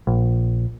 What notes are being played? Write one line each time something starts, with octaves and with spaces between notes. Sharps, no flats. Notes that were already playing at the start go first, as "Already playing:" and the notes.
A#1